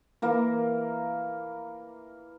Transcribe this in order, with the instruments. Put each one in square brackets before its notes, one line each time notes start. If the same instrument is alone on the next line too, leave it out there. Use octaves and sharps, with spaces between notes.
[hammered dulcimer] E3 A#3 A#4